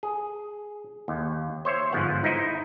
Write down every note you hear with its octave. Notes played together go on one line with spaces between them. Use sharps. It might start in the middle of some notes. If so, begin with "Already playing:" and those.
G#4
D#2
C5 C#5 E5
G1 G#2 F3 B3 F#5
D#4 E4